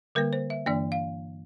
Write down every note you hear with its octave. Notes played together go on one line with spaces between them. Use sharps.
D3 G3 A#3 A#4
C5
E5
G2 E3 A#3 D4 D5
F5